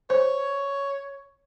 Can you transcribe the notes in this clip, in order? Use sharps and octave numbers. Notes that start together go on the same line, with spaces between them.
C5 C#5